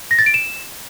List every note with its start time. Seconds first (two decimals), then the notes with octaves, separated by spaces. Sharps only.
0.11 A#6
0.19 A6
0.26 D7
0.34 E7